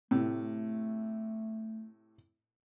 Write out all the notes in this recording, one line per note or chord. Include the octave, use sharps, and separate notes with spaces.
A2 C3 A3